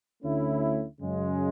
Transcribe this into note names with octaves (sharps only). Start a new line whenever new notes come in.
D2 D3 A3 C#4 E4
F#2 C#3 G#3